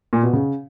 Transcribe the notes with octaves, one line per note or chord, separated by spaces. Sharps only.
A#2
B2
C#3